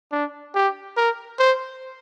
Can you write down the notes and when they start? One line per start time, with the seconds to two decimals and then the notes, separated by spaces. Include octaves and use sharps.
0.12 D4
0.55 G4
0.97 A#4
1.39 C5